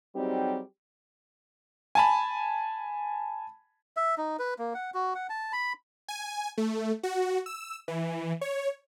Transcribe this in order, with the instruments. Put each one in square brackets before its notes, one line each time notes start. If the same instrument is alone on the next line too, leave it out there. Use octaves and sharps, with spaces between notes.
[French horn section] F#3 G3 C4 D#4 G4 G#4
[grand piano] G#5 A5 B5
[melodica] E5
D#4
B4
A#3
F#5
F#4
F#5
A5
B5
[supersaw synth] G#5
A3
F#4
E6
E3
C#5